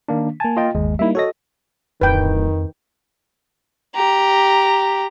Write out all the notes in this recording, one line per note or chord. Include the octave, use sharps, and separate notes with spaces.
D#3 A#3 D4
A#3 G#5 A5
F4 D#5 G5
G1 D#2 G#3
G3 A#3 D#4 E4 E5
F#4 A4 C#5 D#5 A#6
D1 F2 D#3 B4 G5
G4 A#5